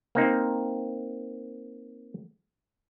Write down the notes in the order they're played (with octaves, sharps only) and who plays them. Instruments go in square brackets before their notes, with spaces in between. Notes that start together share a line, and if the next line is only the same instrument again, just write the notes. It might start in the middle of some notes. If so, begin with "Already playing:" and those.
[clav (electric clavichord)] A#3 C4 D#4